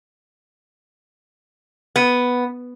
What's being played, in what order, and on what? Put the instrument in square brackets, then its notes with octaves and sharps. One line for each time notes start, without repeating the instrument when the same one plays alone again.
[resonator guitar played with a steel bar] B3